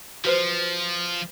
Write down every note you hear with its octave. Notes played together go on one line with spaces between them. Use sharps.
F3 F#4 B4 C5